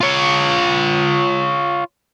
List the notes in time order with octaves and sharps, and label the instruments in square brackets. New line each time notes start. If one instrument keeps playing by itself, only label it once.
[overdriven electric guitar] F4 C#5